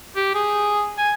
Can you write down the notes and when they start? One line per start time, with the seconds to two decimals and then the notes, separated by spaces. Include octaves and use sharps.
0.16 G4
0.35 G#4
0.98 G#5